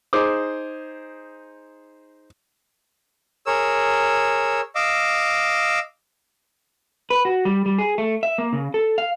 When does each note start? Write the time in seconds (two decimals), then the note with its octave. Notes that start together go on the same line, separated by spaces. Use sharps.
0.13 D#4 G#4 C5 D6
3.46 G#4 A#4 C#5 E6
4.75 D#5 F5 D6 E6
7.10 B4
7.25 F#4
7.45 G3
7.66 G3
7.78 G#4
7.98 A3
8.23 E5
8.38 A#3
8.53 C#3
8.74 A4
8.98 F5